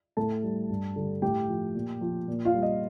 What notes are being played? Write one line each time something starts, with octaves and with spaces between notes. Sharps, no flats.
A2 A4 A5
G3
G2
D3 G3
A2 G4 G5
F3
A#2
F3
A#2
F4 F5
G3
D#5